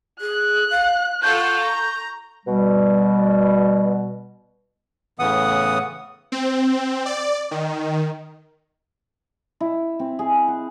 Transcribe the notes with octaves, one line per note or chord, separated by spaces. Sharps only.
G#4 F#6
F5
F4 A4 F#5 C#6 G6
A#5
B2 G3
A2 C#3 E3 B3 F#5 D#6
C4
D5
D#3
E4
C4
G#4
F#5